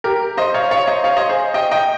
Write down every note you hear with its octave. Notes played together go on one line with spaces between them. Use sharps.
G4 A#4
C5 D#5
C#5 F5
C#5 F5
C5 D#5
C#5 F5
C5 D#5
G#4 C5
D#5 G5
D#5 G5